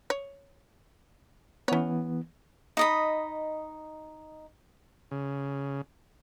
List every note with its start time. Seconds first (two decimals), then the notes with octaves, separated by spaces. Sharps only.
0.10 C#5
1.68 E3 B3 C#4 C#5
2.77 D#4 D#5 B5
5.11 C#3